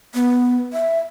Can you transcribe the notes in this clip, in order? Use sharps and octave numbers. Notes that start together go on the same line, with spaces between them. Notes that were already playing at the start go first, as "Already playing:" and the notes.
B3
E5